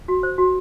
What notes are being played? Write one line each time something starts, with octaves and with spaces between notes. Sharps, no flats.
F#4
C5
F#4